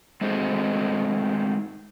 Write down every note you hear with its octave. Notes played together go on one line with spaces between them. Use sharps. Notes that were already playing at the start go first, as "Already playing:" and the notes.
G#3 A3 C4 D#4 F#4 G#4